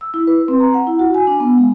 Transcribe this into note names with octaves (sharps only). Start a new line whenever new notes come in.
E6
E4
B4
C4
A#5
F#5
E4
F#4
G#5
D4
B3
G#3